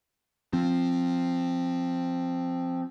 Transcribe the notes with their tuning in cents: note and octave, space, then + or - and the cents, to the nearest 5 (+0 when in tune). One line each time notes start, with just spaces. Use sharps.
F3 +0 C4 +0